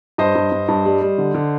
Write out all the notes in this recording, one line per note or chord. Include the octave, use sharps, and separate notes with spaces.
G2 C5 D#5
G2
G2
G2
G3
G3
D3
D3